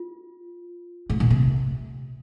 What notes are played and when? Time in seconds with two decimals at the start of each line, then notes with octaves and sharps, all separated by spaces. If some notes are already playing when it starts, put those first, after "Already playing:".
Already playing: F4
1.10 G#2
1.20 A#2
1.30 C3